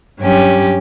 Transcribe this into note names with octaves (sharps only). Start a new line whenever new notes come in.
G2 F#3 C#4 G4